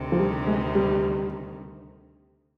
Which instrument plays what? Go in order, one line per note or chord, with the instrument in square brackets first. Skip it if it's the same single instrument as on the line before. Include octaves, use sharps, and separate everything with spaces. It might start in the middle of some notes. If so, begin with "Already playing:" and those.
Already playing: [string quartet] D2 C3 D#3
[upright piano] F3
G3
G#3
G3